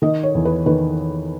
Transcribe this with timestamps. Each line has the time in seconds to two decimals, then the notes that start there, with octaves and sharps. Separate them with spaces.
0.02 D#3 D#5
0.23 C#5
0.35 E2
0.45 B4
0.66 D#3 B4